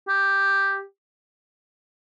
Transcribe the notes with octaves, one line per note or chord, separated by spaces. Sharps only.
G4